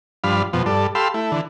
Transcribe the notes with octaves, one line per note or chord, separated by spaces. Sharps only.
G2 F3 D4 F5 B5
F2 B2 F3
G2 A4 D5
G4 A4 F5 B5 C6 E6
A3 E4
D3 E3